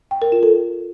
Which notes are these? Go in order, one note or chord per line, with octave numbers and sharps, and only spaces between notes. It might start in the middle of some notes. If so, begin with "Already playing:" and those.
G5
A#4
F4
A4